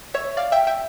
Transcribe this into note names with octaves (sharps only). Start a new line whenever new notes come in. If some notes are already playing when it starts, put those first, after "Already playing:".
C#5 E5
D5 F5
E5 G5
E5 G5